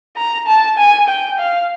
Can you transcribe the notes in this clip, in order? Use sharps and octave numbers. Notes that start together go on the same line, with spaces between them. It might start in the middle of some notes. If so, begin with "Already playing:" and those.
A#5
A5
G#5
G5
F5